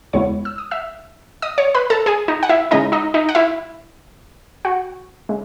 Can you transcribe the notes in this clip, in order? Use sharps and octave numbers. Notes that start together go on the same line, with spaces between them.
E2 C#3 G#3 B3 E4 C#5 C#6
E6
D#6
E5 E6
D#5 D#6
C#5 C#6
B4 B5
A4 A5
G#4 G#5
D#4 D#5
F#5
E4 E5
C#3 G#3 C#4 D#4 E4 D#5
D#4 D#5
D#4 D#5
F#5
E4 E5
F#4 F#5
C#3 G#3